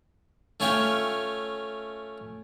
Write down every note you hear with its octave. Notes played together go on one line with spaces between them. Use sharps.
A3 C#4 F4 C#5 E5 G5